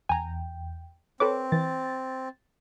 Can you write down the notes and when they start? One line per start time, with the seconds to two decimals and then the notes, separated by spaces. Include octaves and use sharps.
0.09 E2 G5 G#5 A#5
1.20 C4 A4 B4 C#5 D6
1.52 E3 A6